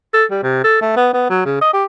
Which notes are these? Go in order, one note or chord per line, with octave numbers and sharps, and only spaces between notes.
A4
G3
C3
A4
A3
B3
B3
F#3
C#3
D#5
G4